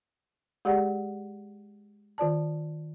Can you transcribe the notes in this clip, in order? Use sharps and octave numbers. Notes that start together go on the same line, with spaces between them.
G#3 G4 G#4 D5 F#5
D#3 F4 D5 A5